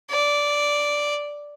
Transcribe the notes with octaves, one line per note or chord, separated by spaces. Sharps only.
D5